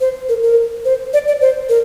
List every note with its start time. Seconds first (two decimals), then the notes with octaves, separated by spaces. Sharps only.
0.01 C5
0.29 A#4
0.43 A#4
0.85 C5
1.13 D5
1.28 D5
1.41 C5
1.69 A#4